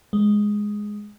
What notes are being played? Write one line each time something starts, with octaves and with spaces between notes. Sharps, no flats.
G#3